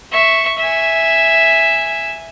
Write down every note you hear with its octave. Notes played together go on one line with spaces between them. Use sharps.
E5 C#6
E5 G#5